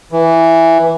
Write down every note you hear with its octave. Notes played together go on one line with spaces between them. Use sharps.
E3